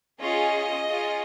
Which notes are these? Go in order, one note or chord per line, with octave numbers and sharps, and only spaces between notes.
C#4 F4 G#4 D#5
C#4 F4 G#4